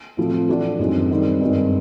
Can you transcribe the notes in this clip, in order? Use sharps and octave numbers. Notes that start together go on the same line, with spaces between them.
A2 F3 A3 C4
E3 A3 D4 F#4
F#2 D#3 G#3 C4
D#3 G3 C4
G2 D#3 G#3 C4